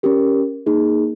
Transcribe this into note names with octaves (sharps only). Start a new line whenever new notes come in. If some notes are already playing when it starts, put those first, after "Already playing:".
C#4 G4 A#4
A#3 D#4 G#4